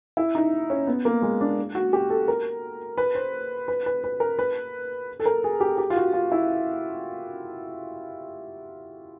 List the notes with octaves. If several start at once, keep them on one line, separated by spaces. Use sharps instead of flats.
E4
D#4
C#4
B3
A#3
G#3
D4
F#4
G4
A4
A#4
B4
C5
B4
B4
B4
A#4
B4
A4
A#4
G#4
G4
G4
F4
F#4
F4
E4